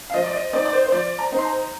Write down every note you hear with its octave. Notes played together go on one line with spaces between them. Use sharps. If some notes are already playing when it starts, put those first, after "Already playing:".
F5
F3 D#5
D5
D#5
C4 D#4 D5
D5
C5
C5
F3 D5
A#5
C4 D#4
C6
A#5